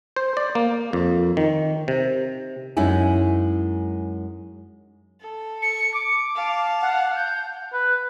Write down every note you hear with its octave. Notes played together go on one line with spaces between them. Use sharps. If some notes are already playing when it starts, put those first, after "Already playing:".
C5
D5
A#3
F2
D#3
C3
F#2 G#3 C#4 D#4 E4 G#5
A4
C#7
D6
F5 A5
F#5
G6
B4